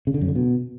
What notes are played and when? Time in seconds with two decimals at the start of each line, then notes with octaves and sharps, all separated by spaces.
0.07 C#3
0.14 D3
0.21 F#2
0.28 D3
0.35 B2